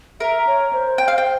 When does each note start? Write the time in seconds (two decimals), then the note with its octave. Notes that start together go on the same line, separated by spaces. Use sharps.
0.20 A#4 E5
0.47 C#5
0.73 C5
0.98 G5
1.08 F5
1.18 G5